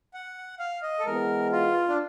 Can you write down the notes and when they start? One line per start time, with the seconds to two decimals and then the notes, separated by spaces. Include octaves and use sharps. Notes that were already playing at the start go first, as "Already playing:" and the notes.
0.14 F#5
0.59 F5
0.82 D#5
0.99 A4
1.05 E3 G#3 B3 A#4
1.52 F4
1.89 D4